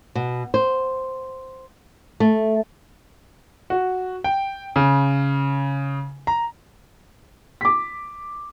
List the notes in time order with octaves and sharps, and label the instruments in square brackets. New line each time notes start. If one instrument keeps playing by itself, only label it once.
[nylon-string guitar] B2
C5
A3
[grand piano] F#4
G5
C#3
A#5
[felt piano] D6 B6